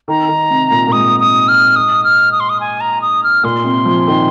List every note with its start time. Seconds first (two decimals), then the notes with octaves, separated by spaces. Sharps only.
0.08 D#3 A#5
0.29 D#3
0.50 C3
0.71 A#2
0.87 A#2
0.92 G#2 D#6
1.20 D#6
1.48 F6
1.76 D#6
2.04 F6
2.32 D#6
2.40 C6
2.50 D#6
2.60 G#5
2.80 A#5
3.02 D#6
3.24 F6
3.44 A#2 C6
3.64 C3
3.85 F3
4.07 D#3